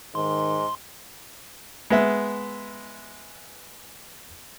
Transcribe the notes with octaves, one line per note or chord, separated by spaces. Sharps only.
G#2 D#3 C6
G#3 B3 E5